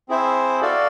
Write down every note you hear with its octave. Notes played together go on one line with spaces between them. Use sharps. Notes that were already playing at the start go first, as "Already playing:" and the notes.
C4 E4 G#4 C5 E5
F#4 A4 D5 F5